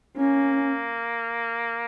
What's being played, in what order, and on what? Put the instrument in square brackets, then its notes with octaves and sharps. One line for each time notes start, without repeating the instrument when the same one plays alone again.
[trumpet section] A#3 [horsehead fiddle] C#4